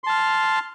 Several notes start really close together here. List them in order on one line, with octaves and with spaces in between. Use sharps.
C6 A5 F6